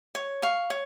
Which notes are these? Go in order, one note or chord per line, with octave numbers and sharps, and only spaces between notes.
C#5
F5 C#6
C#5